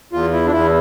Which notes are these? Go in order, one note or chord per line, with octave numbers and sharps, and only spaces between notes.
E2 F4
E4
D4
E2 E4